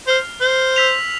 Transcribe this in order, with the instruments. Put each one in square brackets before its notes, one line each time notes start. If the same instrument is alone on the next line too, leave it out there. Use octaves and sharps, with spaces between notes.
[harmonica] C5 [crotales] F6 C7 F7
[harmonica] C5
[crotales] E6 B6 F7